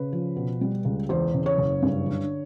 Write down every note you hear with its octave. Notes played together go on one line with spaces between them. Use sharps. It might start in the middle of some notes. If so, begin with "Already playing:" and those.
Already playing: C#3 B4
F3
B2
G3
C#2
E2 C5
C#3
C#5
F#1
G2
D3